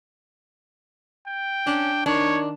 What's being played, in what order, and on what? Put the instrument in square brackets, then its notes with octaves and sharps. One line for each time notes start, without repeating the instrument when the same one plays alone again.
[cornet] G5
[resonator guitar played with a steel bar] C#4 [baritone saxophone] D4
[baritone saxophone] D#3 [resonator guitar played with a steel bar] D4 [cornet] C#5